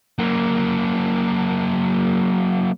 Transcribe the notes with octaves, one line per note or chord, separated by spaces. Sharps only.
F#3 A#3